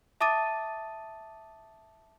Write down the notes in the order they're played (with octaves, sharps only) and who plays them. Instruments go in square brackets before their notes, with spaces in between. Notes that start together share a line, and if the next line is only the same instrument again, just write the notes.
[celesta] E5 A5 D6 D#6 A6 D#7